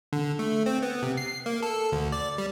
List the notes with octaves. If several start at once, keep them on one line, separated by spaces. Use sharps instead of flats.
D3
A3
C4
B3
C3
C7
A#3
A4
D2
D5
G3